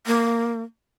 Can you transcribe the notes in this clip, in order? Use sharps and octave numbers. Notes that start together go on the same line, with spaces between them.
A#3